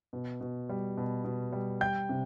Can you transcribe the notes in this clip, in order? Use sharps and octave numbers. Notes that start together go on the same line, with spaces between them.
B2
B2
G3
B2
B2
G3
G3 G5 G6
C3